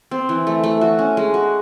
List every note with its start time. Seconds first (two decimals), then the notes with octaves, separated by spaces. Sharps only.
0.11 C4
0.29 E3
0.47 A3
0.64 A3
0.81 F#4
0.99 C#4
1.17 G#3
1.34 F#4